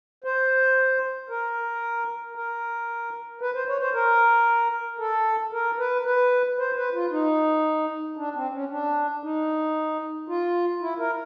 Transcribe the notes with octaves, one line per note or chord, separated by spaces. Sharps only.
C5
A#4
A#4
B4
C5
C#5
C5
A#4
A4
A#4
B4
B4
C5
B4
F4
D#4
D4
C4
C#4
D4
D#4
F4
E4
A#4